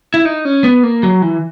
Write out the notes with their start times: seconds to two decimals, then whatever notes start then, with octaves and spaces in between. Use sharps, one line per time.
0.14 E4
0.25 D#4
0.45 C#4
0.64 B3
0.83 A#3
1.03 F#3
1.22 E3